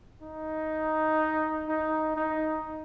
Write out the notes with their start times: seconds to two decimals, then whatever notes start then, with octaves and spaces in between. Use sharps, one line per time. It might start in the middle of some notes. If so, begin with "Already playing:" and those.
0.22 D#4
1.68 D#4
2.16 D#4